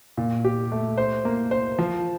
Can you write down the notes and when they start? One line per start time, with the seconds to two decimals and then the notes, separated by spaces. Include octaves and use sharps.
0.17 A#2
0.45 G4
0.72 A3
0.98 C5
1.25 A#3
1.51 C5
1.79 F3